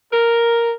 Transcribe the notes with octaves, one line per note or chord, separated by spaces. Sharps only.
A#4